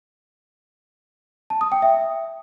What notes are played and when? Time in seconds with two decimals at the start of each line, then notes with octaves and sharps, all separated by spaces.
1.50 A5
1.61 D#6
1.72 G5
1.82 E5